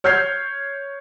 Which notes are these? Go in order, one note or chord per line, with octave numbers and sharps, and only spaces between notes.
C#5 F6 G6 G#6 C7